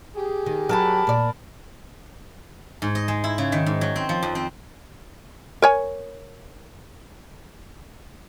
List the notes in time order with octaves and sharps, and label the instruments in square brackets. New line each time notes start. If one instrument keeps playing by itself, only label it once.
[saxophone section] G4 G#4
[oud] D#3
[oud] F#3 [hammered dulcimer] A#4 A5 B5
[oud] A#2 D5
[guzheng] G#2
D#5
G#3
E4
C#3
D#3
G#2
F#3
C4
F3
F2
C4
[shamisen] A#4 C#5 G#5